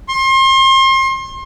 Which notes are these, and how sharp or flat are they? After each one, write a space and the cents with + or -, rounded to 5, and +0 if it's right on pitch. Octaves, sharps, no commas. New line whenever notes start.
C6 +35